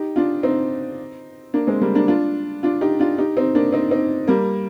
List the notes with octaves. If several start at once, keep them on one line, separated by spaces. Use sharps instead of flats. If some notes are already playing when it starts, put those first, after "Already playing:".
Already playing: D#4 G4
D4 F4
C4 D#4
A#3 D4
G#3 C4
G3 A#3
A#3 D4
D4 F4
D4 F4
D#4 G4
D4 F4
D#4 G4
C4 D#4
A#3 D4
C4 D#4
C4 D#4
G3 A#3